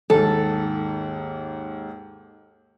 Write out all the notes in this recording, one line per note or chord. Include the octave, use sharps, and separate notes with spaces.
D#2 G#2 A4